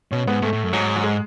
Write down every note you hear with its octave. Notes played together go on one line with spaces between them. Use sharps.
B2 C#4
G#2 B3
G#2 A3
A2
F#2
G#2 F#3
F#3
G#3